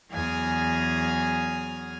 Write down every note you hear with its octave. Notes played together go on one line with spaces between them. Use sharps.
E2 F#3 G#4 G#5 D#6 F6